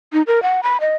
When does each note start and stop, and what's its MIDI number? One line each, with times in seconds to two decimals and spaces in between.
0.13 0.22 63
0.27 0.42 70
0.43 0.60 78
0.63 0.77 83
0.81 0.96 75